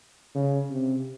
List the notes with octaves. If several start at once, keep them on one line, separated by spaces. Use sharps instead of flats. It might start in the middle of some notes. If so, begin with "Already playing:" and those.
C#3
C3